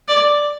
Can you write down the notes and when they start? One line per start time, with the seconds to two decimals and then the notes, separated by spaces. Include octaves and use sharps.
0.08 D5